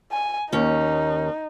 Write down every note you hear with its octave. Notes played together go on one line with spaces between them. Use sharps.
G#5
D#2 C#4 D#4